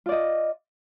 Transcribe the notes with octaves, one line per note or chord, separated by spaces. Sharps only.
F4 D5 D#5